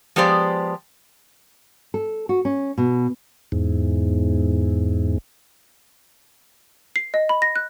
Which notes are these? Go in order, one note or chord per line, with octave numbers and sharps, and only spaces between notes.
F3 G#3 B3 G4 C5 D5
A4
F#4
C#4
B2
E2 G#2
C7
D#5
B5
A#6
F#6